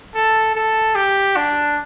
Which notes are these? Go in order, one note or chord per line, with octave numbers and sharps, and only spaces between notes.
A4
A4
G4
D4